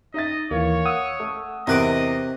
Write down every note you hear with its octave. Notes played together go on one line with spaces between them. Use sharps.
D#4 D#5 E5 A6
D#2 E3 A#3 C#5
F#5 D#6 E6
A3
E2 C3 A#4 D#5 D6 F#6 D7